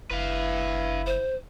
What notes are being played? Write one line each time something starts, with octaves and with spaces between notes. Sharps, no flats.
F#1 E4 B4 F5
C5